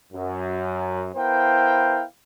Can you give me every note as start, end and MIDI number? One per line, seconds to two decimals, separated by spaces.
0.13 1.10 42
1.16 2.03 59
1.16 2.03 64
1.16 2.03 70
1.16 2.03 72
1.16 2.03 77
1.16 2.03 79